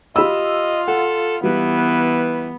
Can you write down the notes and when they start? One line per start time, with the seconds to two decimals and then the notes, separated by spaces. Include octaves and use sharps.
0.16 F4 G4 D#5 B5 E6
0.88 A4 F#5
1.43 E3 G3 B3